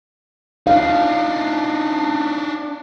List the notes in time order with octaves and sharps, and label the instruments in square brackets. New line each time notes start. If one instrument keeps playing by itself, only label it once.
[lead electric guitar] D4 D#4 [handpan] F5